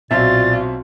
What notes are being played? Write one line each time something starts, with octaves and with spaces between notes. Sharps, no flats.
B1 A#2 C4 F4 F#4 E5 A6